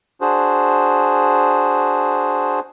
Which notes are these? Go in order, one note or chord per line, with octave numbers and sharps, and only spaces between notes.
D4 F#4 G#4 C5